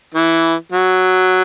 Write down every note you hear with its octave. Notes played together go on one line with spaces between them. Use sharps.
E3
F#3